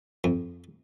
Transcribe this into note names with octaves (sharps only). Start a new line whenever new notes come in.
F2